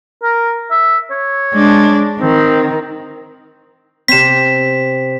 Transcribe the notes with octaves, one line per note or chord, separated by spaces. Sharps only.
A#4
E5
C#5
G#3 D4
D#3 C4
C3 C4 B6 E7